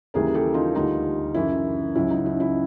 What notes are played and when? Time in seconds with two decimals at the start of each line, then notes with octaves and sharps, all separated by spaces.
0.14 D#2 C#3 E3 G3 G#4 A#4
0.34 G4 A4
0.54 D#4 F4
0.75 D2 D3 G3 D#4 F4
1.34 F#2 C#3 E3 E4
1.95 C#2 C#3 F#3 E4
2.10 D#4
2.26 E4
2.40 E4